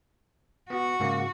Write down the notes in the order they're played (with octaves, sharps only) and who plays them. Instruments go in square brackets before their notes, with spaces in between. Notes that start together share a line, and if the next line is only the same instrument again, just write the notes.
[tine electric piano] B3 [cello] F#4
[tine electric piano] G#2 C#3 A#3